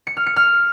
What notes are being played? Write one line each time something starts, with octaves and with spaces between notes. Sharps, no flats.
C#7
F6
C#7
F6